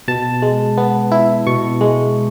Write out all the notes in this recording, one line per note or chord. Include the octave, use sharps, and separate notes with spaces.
B2 A5
G#3
B3
E4
B2 C#6
G#3